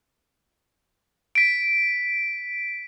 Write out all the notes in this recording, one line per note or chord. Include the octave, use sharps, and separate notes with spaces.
B6 D7